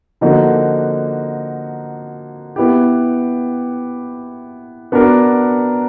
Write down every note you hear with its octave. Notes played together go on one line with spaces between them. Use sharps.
D3 F3 A#3 D#4 F#4
B3 E4 G4
B3 D4 F#4 A#4